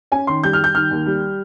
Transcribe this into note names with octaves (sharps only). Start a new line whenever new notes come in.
C#4 G#5
D#3 C6
G3 G6
F6
G3
G6
D#3 F6
D#2
G3